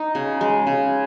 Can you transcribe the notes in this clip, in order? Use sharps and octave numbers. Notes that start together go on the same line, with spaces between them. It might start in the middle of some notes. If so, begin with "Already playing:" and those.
Already playing: D#4
C#3
G#3
C#3